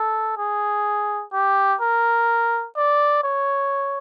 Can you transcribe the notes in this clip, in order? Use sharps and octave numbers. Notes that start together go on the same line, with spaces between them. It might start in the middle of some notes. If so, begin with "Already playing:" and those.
Already playing: A4
G#4
G4
A#4
D5
C#5